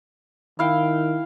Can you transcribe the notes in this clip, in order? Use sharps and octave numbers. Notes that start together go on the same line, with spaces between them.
D#3 E4 F5 G5